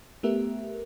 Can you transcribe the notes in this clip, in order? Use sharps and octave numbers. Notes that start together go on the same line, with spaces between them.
A3 B3 G4 A#4 E5